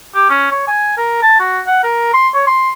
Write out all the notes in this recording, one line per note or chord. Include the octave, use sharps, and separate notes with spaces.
G4
C#4
C#5
G#5
A#4
A5
F#4
F#5
A#4
C6
C#5
C6